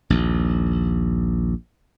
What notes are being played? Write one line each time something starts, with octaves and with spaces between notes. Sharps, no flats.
A#1 D#2